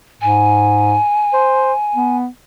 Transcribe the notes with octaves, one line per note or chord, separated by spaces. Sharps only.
G#2 G#5
C5
B3